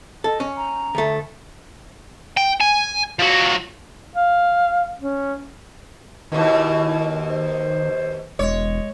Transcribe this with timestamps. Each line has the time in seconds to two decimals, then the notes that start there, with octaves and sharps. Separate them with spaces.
0.24 A4 D#5
0.40 C#4
0.56 A#5
0.95 D2 A3
2.37 G5
2.61 G#5
3.19 F3 F#4
4.15 F5
5.00 C#4
6.32 D#2 B2 D#3 E4
7.29 C5
8.39 E1 G#3 C#5